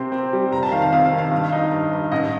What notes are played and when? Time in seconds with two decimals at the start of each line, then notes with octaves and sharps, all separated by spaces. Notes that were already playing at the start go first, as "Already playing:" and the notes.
Already playing: C3 C4 C6
0.12 C4
0.33 G3
0.52 F1 A#5
0.63 A5
0.72 D#3 F5
0.82 F5
0.92 F2 F5
1.05 F5
1.11 D#3
1.18 F5
1.31 G2
1.52 D#4
1.72 G2
1.92 G2
2.12 A1 D#5